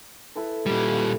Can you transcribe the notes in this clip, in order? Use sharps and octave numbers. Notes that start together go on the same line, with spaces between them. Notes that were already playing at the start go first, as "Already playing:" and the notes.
E4 A4 B4
A#2 G3